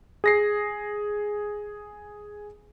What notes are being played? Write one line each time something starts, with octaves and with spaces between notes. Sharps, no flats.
G#4 A#6 C7